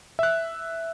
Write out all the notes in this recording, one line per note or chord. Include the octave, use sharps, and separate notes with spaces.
E5 F#6